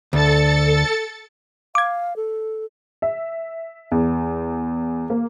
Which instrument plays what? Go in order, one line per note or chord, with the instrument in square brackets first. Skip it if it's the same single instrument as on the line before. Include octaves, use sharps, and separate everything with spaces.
[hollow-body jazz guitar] D2 [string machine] A4 A6 C#7
[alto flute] F5 [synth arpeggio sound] D6 G#6
[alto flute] A4
[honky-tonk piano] E5
E2
A#3